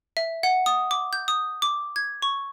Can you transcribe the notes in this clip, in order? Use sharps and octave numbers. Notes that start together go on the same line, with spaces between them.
E5
F#5
D#6
D6
G6
D#6
D6
G#6
C#6